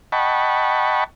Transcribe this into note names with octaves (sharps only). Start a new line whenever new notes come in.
D#5 F#5 G5 A5 B5 C#6